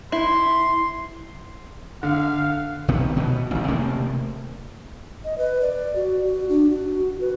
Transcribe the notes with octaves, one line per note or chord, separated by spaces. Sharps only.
E4 C6
D3 F5
B1 C3 D#3 B3
B2 A#3 B3
A1 D#3
C3 A3 A#3
D#5
B4
D5
F#4
F#4
D4
F#4
F#4
B4